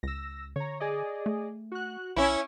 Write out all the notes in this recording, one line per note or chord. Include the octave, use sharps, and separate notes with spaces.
C#2 E6 A#6
D3 C#5 A#5
G#4 D5 D#5
A3
F#4 F#6
B1 C#4 E4 B5